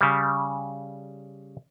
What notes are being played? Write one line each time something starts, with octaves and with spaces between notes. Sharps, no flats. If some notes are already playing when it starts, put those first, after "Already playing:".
C#3 G3